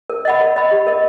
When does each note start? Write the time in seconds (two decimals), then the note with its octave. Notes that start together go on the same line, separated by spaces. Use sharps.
0.10 A#4
0.25 D#5 F#5 B5
0.41 A#4
0.56 D#5 F#5 B5
0.71 G4
0.87 A#4 D#5